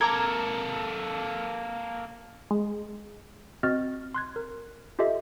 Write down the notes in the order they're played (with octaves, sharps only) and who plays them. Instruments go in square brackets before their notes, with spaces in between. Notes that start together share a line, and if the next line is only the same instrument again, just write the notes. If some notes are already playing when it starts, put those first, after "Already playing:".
[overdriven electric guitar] A#3 A4 [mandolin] A#4 [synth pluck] A#5 D6 G#6
[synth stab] G#3
[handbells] C4 F#4 D#5 F6 A6
C6 F#6 G#6
A#4
F4 G4 A4 D#5 E5